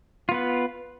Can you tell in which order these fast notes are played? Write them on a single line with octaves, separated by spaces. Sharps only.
F4 B3 B4